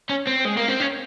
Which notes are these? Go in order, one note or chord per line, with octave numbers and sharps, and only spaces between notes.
C#4
C4
G#3
A#3
C4
C#4